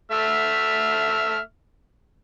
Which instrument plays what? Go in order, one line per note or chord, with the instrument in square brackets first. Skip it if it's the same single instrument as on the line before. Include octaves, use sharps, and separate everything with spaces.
[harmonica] A3 E5 F6